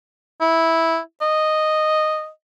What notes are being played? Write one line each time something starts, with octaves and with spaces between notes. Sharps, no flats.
E4
D#5